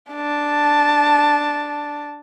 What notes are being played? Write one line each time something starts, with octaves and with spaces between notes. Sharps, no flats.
D4 A5